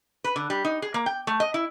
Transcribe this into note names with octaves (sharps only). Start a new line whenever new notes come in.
B4
D3
G3
D#4
G#4
A#3
G5
A3
D#5
E4